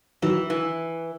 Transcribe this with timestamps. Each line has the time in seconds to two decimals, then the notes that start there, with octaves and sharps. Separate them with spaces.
0.22 D#3 E3 F#3
0.50 E3